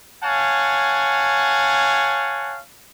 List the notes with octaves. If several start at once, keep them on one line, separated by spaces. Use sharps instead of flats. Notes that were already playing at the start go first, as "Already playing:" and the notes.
C#5 F5 F#5 G#5 A5